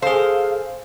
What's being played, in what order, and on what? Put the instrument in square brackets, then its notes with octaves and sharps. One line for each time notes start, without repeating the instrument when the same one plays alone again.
[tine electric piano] G#4 A4 [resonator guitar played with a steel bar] C5 [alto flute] F5